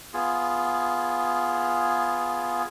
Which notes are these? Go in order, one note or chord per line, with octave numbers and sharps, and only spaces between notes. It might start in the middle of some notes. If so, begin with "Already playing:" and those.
B3 F4 G#4